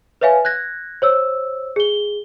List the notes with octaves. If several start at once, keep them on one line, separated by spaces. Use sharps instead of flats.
B4 C#5 E5 F5 G#5
F#6 G#6 A#6
C5 C#5 E6
G#4 G7